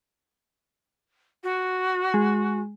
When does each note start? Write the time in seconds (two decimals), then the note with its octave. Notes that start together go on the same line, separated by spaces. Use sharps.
1.43 F#4
2.14 G#3